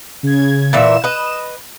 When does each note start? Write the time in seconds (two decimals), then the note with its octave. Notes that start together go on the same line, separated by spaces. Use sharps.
0.23 C#3 G#6
0.73 A#2 E3 E5 E7
1.04 B4 D#5